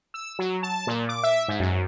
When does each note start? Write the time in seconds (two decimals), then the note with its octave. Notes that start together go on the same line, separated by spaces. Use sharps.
0.14 E6
0.39 F#3
0.63 A5
0.87 A#2
1.09 D6
1.23 E5
1.48 G#2
1.60 F#2